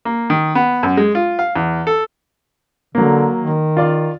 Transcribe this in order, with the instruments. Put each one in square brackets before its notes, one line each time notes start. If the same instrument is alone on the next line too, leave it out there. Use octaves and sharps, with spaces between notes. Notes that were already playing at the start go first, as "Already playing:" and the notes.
[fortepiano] A#3
D#3
B3
F#2
G#3
F4
F5
E2
A4
[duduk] D3 [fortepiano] F#3 A#3
[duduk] D#3
[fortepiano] F4 D5 F5